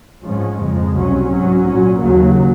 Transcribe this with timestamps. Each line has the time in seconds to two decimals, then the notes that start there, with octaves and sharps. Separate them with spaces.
0.24 G#2 F3 G#3 C#4
0.60 F2 C#3 F3 G#3
0.95 C2 C3 F#3 C#4
1.30 G#2 F#3 C#4
1.66 A#2 F#3 C#4
2.02 D#2 C#3 F#3 A#3